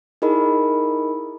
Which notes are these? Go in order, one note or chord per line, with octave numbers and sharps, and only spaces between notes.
D#4 E4 G#4 A#4 D#5 B5